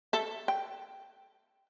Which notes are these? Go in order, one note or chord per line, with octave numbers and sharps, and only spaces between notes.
A4 E5
G5